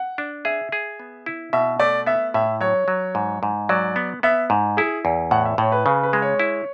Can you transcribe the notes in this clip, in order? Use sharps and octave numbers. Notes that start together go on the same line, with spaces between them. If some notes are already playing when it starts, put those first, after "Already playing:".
Already playing: F#5
D4
G#4 E5
G#4
B3
E4
B2 E5
A3 D5
B3 E5
A2 E5
F#3 C#5
F#3
G#2
G#2
F#3 D5
B3
B3 E5
G#2
E4 G#4
E2
A2 F#5
E5
A2 C#5
B4
C#3 B4
B4
G#3
C#5
E4